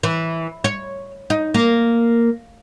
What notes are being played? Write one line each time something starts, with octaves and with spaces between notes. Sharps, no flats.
E3
C#5
D#4
A#3